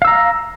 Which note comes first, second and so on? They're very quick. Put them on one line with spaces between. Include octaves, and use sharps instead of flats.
F5 E6 A#5